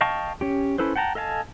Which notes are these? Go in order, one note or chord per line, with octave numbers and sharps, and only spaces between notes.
D#5 F5 G5 A5 C#6
C#4 G4
C#4 E4 A4 B4 C5
F#5 G5 A5 A#5
A4 D#5 F5 G#5 A5